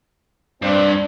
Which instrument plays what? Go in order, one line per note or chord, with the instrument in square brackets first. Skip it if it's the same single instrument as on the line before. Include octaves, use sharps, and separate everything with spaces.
[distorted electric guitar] G2 [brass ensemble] C4 D5